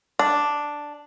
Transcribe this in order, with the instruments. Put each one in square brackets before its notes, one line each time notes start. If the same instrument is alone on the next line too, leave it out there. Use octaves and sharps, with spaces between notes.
[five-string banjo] D4